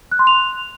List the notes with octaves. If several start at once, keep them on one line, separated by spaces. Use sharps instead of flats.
F#6
C6
F7